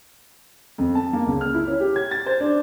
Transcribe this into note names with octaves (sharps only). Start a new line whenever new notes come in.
F2
A5
A#3
C#2
F6
E4
C#4
G4
G#6
A6
C5
D4